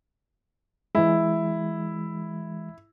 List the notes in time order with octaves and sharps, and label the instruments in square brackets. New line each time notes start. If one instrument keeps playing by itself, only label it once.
[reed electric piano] E3 G#3 [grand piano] E4